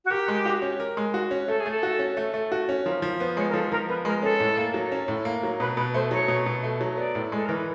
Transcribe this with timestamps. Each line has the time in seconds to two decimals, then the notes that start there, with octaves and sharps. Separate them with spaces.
0.05 F#4
0.10 G4 A#4
0.28 G#3
0.46 F#4
0.62 C#4
0.80 A#4
0.97 G#3
1.14 F#4
1.31 C#4
1.48 A3 A4
1.60 G#4
1.66 A3
1.71 A4
1.83 F#4
1.99 C#4
2.17 A3
2.34 A3
2.52 F#4
2.69 C#4
2.85 F3 A#4
3.02 F3
3.20 B3 C5
3.37 G#3 C#5
3.49 A#4
3.54 F3 A4
3.71 F3 A#4
3.88 B3 B4
4.05 G#3 A#4
4.22 C#4 A4
4.40 A2
4.57 A#3
4.74 F#3
4.92 C#4
5.08 A2
5.25 A#3
5.43 F#3
5.60 B2 B4
5.77 B2 B4
5.94 A3 C5
6.11 F#3 C#5
6.28 B2
6.46 B2
6.63 A3
6.81 F#3
6.97 B3 D5
7.15 A2
7.32 G#3 A4
7.46 E3 A#4
7.56 B4